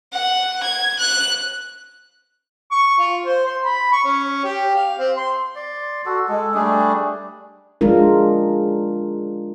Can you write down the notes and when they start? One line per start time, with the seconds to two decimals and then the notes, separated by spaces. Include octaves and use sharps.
0.13 F#5
0.63 G#6
0.98 F#6
2.71 C#6
2.99 F4
3.25 C5
3.46 C6
3.65 B5
3.92 C#6
4.05 C#4
4.44 G4
4.75 F5
4.98 C4
5.17 C6
5.56 D5 C6
6.06 F#4 A4
6.28 G#3 A4
6.54 G3 A3 D4 G#4
7.81 G#3 D4 F4 A#4